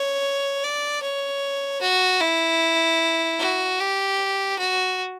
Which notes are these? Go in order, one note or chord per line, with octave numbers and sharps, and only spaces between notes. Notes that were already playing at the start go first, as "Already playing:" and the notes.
Already playing: C#5
D5
C#5
F#4
E4
F#4
G4
F#4